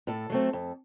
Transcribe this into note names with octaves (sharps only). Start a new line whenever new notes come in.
A2 A4
F#3 A3 C4
F2